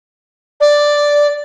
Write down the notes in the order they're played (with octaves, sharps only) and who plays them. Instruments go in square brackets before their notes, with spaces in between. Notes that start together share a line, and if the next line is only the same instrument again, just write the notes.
[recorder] D5